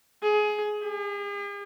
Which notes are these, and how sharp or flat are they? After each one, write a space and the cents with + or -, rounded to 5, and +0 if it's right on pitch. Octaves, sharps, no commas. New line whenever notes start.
G#4 +20
G#4 -45